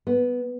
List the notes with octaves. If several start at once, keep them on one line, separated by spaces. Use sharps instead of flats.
B3